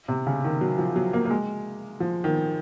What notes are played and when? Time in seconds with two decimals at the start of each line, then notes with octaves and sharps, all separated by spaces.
0.08 C3
0.27 C#3
0.44 D#3
0.61 F#3
0.78 F3
0.96 F#3
1.13 A#3
1.25 A#3
1.30 G#3
2.00 F3
2.24 D#3